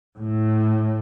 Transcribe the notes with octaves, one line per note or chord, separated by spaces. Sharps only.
A2